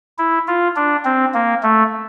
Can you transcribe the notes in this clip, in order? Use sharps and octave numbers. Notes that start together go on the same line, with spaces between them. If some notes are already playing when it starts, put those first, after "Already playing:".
E4
F4
D4
C4
A#3
A3